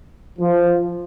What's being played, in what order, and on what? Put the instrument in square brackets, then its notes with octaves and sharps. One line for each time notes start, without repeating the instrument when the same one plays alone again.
[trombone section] F3